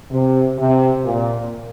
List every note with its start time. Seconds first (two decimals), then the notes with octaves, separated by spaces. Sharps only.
0.11 C3
0.58 C3
1.04 A#2